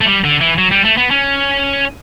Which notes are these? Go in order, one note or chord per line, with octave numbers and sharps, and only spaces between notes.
A3
G3
D3
E3
F#3
G3
A3
B3
C#4